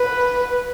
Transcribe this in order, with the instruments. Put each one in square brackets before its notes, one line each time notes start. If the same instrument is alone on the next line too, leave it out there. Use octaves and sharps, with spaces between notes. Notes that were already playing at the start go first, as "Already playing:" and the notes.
Already playing: [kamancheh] B4